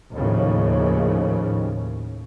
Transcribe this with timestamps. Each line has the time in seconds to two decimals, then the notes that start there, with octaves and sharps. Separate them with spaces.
0.15 D#2 A2 C#3 F3